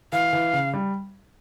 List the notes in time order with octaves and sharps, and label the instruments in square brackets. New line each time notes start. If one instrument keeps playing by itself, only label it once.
[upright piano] E3 [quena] F5
[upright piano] E3
C#3
G3